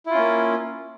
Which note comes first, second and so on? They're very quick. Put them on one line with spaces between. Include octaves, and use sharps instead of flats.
E4 F4 C#4 A#3